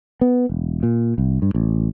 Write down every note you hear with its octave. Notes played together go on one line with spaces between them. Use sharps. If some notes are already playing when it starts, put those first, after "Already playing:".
B3
E1
A#2
C2
G2
A1